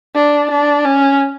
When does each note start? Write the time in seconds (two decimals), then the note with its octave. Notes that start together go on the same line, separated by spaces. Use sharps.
0.15 D4
0.50 D4
0.85 C#4